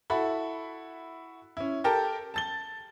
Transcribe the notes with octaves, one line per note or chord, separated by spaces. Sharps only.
E4 F#4 A4 B5
C#4 E4
G4 A4 A#4 G5 A5
A5 A6 G7